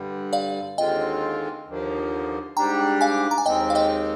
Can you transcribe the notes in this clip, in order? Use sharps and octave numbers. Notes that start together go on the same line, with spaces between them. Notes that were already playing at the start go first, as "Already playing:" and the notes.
Already playing: G2 D3 G3
D5 F5
D#2 D3 G#3 C4 F4 D#5 G5
D#2 D3 F3 A#3
G#2 G3 D4 G4 G5 A#5
F5 G#5
A#5
G#5
D#2 D#3 G#3 C4 D#5 G5
F5
D#5 G5